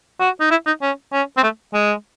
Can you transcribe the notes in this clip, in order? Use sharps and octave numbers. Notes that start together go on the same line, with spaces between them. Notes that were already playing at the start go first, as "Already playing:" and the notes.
F#4
D#4
E4
D#4
C#4
C#4
C4
A3
G#3